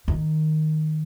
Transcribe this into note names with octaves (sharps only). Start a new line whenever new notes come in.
D#3